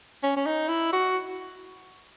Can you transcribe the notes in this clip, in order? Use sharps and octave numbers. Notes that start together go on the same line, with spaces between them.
C#4
C#4
D#4
E4
F#4